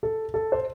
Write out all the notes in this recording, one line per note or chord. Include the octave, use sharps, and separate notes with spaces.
A4
A4
C5